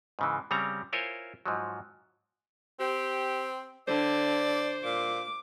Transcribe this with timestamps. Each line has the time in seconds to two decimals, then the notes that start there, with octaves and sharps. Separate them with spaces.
0.19 G#2 C#3 E3
0.51 C#3 G3 C4 C#5 A#5
0.93 E4 F4 A#4 C5 C#5 G#5
1.46 G#2 F3 F#3
2.80 C4 G4
3.88 D3 C5 D5
4.84 A#2 D6